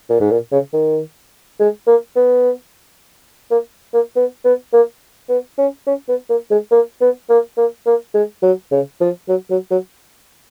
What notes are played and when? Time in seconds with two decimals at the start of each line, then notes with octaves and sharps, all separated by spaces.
0.10 A#2
0.20 G#2
0.31 A#2
0.52 C#3
0.73 D#3
1.60 G#3
1.87 A#3
2.16 B3
3.51 A#3
3.94 A#3
4.16 B3
4.45 B3
4.73 A#3
5.29 B3
5.58 C#4
5.87 C#4
6.08 B3
6.30 A#3
6.51 G#3
6.71 A#3
7.01 B3
7.30 A#3
7.57 A#3
7.86 A#3
8.14 G#3
8.43 F#3
8.71 C#3
9.01 F3
9.29 F#3
9.51 F#3
9.71 F#3